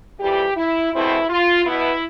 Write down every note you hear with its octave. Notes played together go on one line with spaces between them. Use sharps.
F2 E3 G3 G4
E4
E2 B2 A3 C4 E4
F4
B2 B3 E4